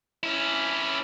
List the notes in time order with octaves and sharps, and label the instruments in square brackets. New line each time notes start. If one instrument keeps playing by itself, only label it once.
[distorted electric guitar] C#4 E4